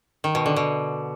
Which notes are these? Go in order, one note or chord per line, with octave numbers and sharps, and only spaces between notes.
D#3
B2
D3
B2